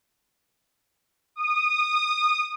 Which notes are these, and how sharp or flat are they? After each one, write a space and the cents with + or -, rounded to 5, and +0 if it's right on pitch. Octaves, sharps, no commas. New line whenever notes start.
D#6 -20